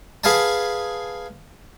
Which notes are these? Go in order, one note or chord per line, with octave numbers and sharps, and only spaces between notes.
G#4 B4 F5 F#5 G#5 A5